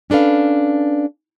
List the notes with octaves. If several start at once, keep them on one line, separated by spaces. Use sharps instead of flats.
C#4 D4 A4 B4 F5